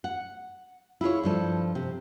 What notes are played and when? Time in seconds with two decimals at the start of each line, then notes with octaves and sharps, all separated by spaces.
0.04 F#5
1.01 E4 F4 G#4 C#5
1.23 G2 F3 A4
1.75 C3